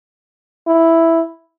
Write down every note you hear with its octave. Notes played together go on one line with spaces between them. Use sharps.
E4